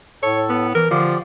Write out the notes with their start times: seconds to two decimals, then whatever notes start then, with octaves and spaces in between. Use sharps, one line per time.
0.23 A2 A4 C#5
0.49 B3
0.75 E3 A#4
0.91 D3 F3 G4 D5